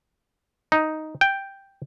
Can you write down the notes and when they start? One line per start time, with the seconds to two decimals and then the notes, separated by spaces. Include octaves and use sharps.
0.72 D#4
1.21 G5